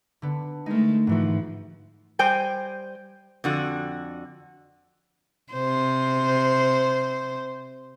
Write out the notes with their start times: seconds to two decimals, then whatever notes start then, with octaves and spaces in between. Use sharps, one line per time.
0.22 D3 B3
0.66 G#3 A3 D#4 A#4
1.07 G#2 E3 F3 F#4
2.19 G3 C5 G5 G#5
3.44 F2 D3 F#4
5.53 C3 C5